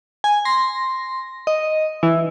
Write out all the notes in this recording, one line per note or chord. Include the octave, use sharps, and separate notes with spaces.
G#5
C6 A#6
D#5
E3 E4